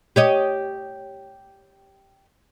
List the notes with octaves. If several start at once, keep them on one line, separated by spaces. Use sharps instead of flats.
G4 C#5 D#5